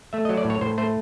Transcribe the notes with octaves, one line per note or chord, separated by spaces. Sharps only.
A3 E5
D#5
F#3
D5
A2
C#5
A2 C5
A3 C5